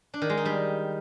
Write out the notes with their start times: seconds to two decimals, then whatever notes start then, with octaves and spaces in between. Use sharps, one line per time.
0.14 D4
0.22 D#3
0.29 G#3
0.37 D#4
0.45 G3